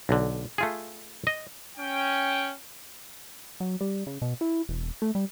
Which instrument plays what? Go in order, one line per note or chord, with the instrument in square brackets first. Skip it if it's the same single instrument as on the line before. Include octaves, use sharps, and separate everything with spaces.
[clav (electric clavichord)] B1 D3
A3 F4 G#4
D#5
[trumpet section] C#4 G5
[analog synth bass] F#3
G3
C#3
B2
E4
E1
A3
G3